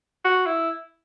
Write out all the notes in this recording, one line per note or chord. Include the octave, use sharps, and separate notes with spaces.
F#4
E4